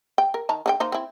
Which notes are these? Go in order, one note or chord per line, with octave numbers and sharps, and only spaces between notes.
G5
A#4
D#3 A5 A#5
D3 D4 G5
A#3 D#4 C5
C4 E4